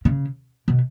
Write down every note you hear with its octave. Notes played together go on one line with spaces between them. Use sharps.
C#3
B2